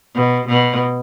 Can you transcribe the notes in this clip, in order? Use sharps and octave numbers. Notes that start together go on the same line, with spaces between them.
B2
B2